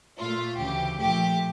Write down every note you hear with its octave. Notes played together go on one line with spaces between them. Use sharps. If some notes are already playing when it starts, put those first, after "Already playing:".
A#2 A3 F4
D2 C#3 E3 G4
A#2 F3 A3 G4